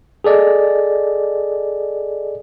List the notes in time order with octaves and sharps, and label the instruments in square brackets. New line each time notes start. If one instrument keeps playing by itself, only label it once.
[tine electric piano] G#4 A4 D5 D#5